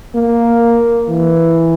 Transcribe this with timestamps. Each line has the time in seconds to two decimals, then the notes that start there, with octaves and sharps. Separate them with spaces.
0.16 A#3
1.09 E3